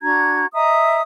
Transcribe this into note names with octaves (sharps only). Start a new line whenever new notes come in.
D4 F#4 A#5 G#6
D#5 E5 A#5 D#6